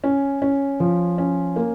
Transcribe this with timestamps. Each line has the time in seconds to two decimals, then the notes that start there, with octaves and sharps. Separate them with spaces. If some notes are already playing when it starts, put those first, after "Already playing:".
0.04 C#4
0.42 C#4
0.80 F3
1.18 C#4
1.56 A#3